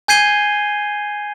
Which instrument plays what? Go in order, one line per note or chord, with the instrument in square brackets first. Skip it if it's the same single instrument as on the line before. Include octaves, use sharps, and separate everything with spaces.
[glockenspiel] G#5 G6 G#6 C7 D#7 G7